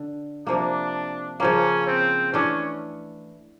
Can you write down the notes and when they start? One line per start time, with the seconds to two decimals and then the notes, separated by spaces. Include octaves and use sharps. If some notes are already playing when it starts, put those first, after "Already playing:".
Already playing: D3
0.47 C3 F3 A#3 D4
1.40 C#3 F3 A#3 C#4
1.87 C4
2.33 E3 A3 C#4 D4